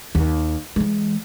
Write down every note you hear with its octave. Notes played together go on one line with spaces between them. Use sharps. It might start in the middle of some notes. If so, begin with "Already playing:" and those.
D#2
E3 G#3